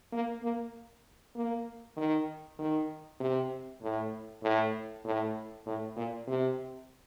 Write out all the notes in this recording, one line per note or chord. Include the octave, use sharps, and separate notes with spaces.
A#3
A#3
A#3
D#3
D#3
C3
A2
A2
A2
A2
A#2
C3